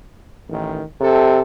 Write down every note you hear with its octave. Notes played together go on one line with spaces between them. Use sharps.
A1 D#3
C3 A4